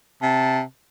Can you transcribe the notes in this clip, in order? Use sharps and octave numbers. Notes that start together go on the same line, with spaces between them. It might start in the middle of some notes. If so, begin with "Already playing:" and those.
C3 A5